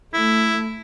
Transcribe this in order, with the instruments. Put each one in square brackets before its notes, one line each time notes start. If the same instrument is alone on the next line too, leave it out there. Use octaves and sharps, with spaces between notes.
[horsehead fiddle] A3 [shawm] E4